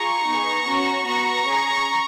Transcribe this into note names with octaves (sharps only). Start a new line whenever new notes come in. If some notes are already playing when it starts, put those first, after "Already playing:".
Already playing: F4 G#4 A#5 C#6
B3 D#4 G#4
C#4 F#4
B3 F#4 A#5 C#6
C#4 G#4